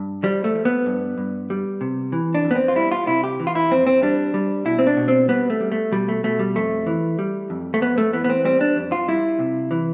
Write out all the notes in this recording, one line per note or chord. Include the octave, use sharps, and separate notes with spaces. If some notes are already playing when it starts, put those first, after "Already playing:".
Already playing: G2
F3 G3
A3
F3
B3
G2
G2
G3
C3
E3
D4
F2
B3
C4
F4
G3 E4
F4
C3 E4
G4
E3
F4
E4
F2 C4
C4
G3 D4
G3
B2 E4
C4
D4
B2
C4
G3 B3
A3
G3
A3
B2 G3
A3
B2 A3
G3
F2 A3
E3
G3
F2
A3
F2 B3
A3
E3 B3
B3
C4
G3 C4
D4
F2
F4
G3 E4
C3
E3